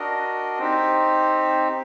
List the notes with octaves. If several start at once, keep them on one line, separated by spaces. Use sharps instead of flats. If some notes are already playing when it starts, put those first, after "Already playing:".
Already playing: D4 F#4 A#4 D#5
C4 D#4 G4